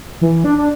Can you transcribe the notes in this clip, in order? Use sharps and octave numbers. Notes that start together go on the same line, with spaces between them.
E3
D4
D4